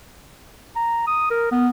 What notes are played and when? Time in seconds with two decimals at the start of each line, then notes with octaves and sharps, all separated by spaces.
0.76 A#5
1.07 D#6
1.30 A#4
1.52 B3